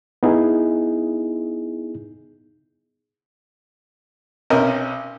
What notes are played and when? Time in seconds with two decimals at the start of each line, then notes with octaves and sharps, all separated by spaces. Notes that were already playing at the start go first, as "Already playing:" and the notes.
0.23 B3 D#4 E4 G#4
4.50 B1 C3 C#4 A#4 D#5